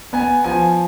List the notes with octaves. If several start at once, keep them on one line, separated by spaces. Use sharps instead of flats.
B3 G#5
F3 G#5